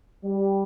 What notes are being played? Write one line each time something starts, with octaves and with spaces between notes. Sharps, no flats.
G3